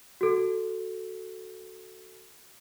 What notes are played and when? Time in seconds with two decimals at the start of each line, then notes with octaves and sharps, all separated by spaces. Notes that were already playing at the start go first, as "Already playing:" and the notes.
0.21 F#4 A4